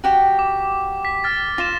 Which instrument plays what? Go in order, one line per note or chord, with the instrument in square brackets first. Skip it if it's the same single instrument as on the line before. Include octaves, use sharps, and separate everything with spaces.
[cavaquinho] F#4 G4 G5
[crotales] D6
B6
F6 A6
[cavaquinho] F4 [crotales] A#6 E7